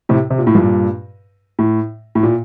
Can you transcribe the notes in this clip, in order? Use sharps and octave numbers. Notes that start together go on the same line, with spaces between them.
A2 C3
C3
A#2
A2
G2 A#2
A2
A2
A#2